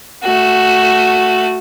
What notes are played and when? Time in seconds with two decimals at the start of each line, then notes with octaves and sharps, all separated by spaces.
0.23 A3 F#4